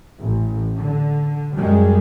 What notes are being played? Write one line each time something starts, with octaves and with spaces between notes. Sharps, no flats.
A1
D3
F#2 G3 G#3